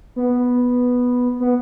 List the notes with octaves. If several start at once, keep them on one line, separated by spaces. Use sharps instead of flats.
B3
B3